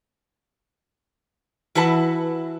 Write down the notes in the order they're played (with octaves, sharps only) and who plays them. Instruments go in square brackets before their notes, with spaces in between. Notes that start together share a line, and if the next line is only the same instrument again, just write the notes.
[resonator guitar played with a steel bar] E3 E4 F#4 B4 A5